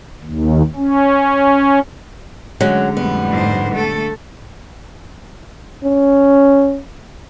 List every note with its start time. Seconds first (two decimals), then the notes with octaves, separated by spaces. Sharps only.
0.23 D#2
0.76 C#4
2.61 D3 F#3 G#3 C#4
2.97 F2 A2 G3 B3
3.30 G#2 C5
3.74 A3 A4
5.84 C#4